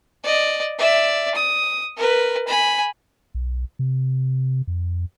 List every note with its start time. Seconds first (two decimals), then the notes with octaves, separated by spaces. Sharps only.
0.24 D5 D#5
0.78 D5 E5
1.35 D#6
1.97 A#4 B4
2.48 G#5 B5
3.35 B1
3.79 C3
4.67 F2